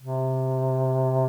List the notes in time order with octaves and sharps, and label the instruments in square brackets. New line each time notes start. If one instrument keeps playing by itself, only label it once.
[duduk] C3